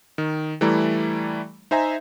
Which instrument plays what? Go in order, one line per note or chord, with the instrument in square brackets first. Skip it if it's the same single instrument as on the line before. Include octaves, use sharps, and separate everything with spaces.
[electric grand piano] D#3
E3 G3 A3 E4 D5 A#5
D#4 C5 E5 G#5 A#5